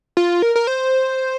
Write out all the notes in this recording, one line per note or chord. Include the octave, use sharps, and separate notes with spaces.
F4
A#4
A#4
C5